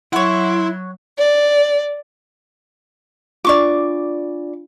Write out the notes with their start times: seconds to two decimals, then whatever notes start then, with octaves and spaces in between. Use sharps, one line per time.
0.13 F#3 E4 C#5 F#5 C6
1.17 D5
3.45 D4 F4 D5 C#6 D6